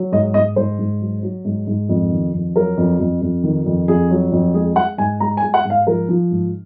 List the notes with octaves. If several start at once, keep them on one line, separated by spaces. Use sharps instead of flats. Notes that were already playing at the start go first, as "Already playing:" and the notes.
Already playing: F#3
G#2 D#5
G#2 D#5
G#2 C5
G#2
F#3
F#3
G#2
G#2
F2
D#3
F2
F#3 A#4
F2
F2
F2
D#3
F2
F2 G#4
F#3
F2
G#3 G#4
G#3 F#5
G#2 G#5
G#3 A#5
G#5
G#3
F#5
G#2
F5
F3 A#4
F3
G#2